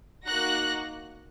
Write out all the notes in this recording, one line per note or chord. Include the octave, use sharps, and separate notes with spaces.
A#3 D#4 F#4 F#6 A#6